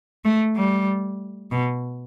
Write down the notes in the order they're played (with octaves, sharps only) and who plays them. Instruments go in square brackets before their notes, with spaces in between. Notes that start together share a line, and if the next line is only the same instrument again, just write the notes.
[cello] A3
G3
B2